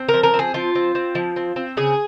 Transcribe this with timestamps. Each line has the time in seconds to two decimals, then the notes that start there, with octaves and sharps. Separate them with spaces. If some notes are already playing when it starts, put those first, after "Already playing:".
Already playing: C4
0.09 A#4
0.14 F3
0.23 A#4
0.34 C4
0.39 G#4
0.54 F3 F4
0.75 C4
0.95 C4
1.15 F3
1.36 C4
1.56 C4
1.77 C#3 G#4